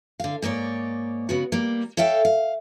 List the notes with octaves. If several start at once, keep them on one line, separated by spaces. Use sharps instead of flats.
D3 F5
G#2 A#3 D#4 C#5 D5
C#3 B3 F#4
G3 A#3
A4 C#5 E5 F5 G5
F5